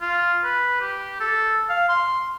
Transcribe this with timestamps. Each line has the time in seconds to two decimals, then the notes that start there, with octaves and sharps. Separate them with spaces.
0.01 F4
0.44 B4
0.81 G4
1.20 A4
1.69 F5
1.89 C6